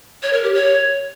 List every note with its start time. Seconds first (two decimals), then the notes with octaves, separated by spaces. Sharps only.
0.23 C#5
0.33 A#4
0.43 G4
0.54 C#5